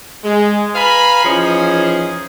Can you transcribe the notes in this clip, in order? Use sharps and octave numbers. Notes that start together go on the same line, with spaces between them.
G#3
B4 F5 G#5 A#5 B5
E3 F3 C#4 D#4 G#4